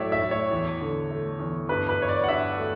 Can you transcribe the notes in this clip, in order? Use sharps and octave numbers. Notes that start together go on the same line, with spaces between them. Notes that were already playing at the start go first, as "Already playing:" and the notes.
Already playing: A2 F#3 C#5 D5 E5
E5
A2
C#5
E2
D3
A3
E2
G2 B4
B4
G2 C#5
D5
F#5
G2 E5
A3